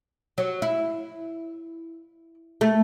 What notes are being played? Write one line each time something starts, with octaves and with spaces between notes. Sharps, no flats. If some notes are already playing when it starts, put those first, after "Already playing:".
F#3
E4
A3